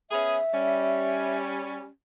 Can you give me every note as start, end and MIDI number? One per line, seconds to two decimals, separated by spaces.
0.11 0.37 59
0.11 0.37 61
0.11 0.37 68
0.11 1.37 76
0.54 1.87 55
0.54 1.87 61